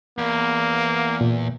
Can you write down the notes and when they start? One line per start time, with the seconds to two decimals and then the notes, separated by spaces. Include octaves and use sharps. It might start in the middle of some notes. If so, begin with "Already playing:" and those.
0.18 E2 A#3
1.21 A#2